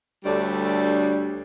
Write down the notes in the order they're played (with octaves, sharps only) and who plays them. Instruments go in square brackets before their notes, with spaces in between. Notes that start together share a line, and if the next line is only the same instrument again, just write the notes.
[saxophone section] D2 G3 D4 A4 C#5 D5